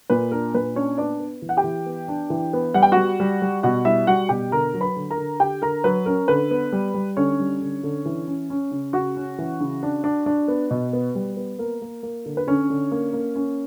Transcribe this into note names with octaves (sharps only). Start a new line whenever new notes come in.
A#2 B4
D4 A#4
A#2 B4
C#4 D4 C#5
B3 D4 D5
B3
E3
F#5
G4 G5
E3
B3
D4
E3
B3
G3 F#5
G5
G3 F#4 F#5
G3
G3
B2 F#4 F#5
G3 E4 E5
G3 F#4 F#5
B2 G4 G5
D3 A#4 A#5
F#3
B4 B5
D3
A#4 A#5
D3
D3 G4 G5
D3 A#4 A#5
F#3 B4
C#4 A#4
D3 B4
B3
G3
G3
D3 C#4 C#5
G3
D3
D3
E3
C#4
C#4
C#3
C#3 F#4 F#5
C#4
E3
C#3
D4
D4
D4
B3
B2
B3
G3
B3
A#3 A#4
A#3
A#3
D3
B4
D3 C#4 C#5
D3
A#3
A#3
C#4